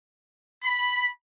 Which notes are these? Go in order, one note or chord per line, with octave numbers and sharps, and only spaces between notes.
B5